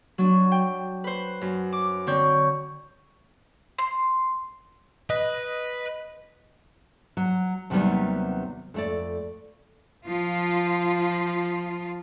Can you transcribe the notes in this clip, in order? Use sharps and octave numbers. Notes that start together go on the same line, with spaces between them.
F#3 D4
G5
B4 C5
F#2
D6
D3 C4 C#5 G6
C6
B4 D#5
F#3
D#2 C3 D#3 F#3 G3 B3
F2 A3 D5
F3 F4